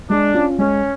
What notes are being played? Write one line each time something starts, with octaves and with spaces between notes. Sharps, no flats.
G#3 D4
C#4 F4
G#3 C#4